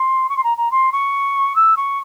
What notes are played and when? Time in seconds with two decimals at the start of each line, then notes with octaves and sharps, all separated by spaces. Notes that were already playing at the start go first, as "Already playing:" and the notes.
Already playing: C6
0.29 C#6
0.37 C6
0.44 A#5
0.57 A#5
0.71 C6
0.92 C#6
1.56 E6
1.77 C#6